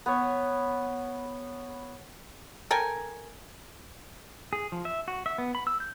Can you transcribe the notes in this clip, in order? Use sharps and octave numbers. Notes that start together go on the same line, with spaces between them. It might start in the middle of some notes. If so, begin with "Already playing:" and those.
B3 C#5
A4 A#4 G5 G#5
G#4
F3
E5
F#4
E5
B3
B5
E6
G6